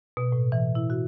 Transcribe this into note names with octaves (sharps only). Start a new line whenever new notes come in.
B2
A2
E3
E4
F#4